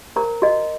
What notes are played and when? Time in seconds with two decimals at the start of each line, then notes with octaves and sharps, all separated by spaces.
0.16 A#4 C5 A#5
0.42 F#4 D#5